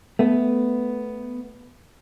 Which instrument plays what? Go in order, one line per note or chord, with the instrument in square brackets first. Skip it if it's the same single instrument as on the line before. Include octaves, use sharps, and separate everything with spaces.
[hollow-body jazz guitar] A3 B3